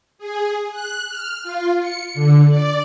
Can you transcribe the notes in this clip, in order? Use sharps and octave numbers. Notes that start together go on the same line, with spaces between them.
G#4
F#6
F6
F4
C#7
D3
D5